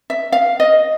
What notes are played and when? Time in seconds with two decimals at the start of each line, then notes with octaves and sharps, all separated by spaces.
0.10 E5
0.32 F5
0.60 D#5